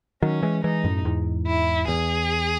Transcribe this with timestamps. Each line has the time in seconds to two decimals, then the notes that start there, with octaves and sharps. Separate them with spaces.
0.22 D#3 F#3 C#4
0.43 E3 G#3
0.64 E3 G#3 D#4
0.84 F#2 A2
1.05 E2 G#2
1.47 E4
1.88 E2 G#4